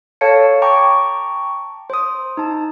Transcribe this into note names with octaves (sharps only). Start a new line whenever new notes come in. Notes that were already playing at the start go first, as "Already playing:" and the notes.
A4 C#5 F5 A5 C#7
G5 A5 A#5 C#6 D6
C5 D#6
D#4 A5